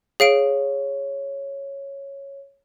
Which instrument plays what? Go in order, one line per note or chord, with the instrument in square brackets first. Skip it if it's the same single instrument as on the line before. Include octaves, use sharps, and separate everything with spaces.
[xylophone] G#4 F5 D7 [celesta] C#5